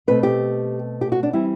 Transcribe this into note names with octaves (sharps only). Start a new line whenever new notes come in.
B2 A3 C4 B4
G4
G4
F#4
D4
E3 G3 C4 E4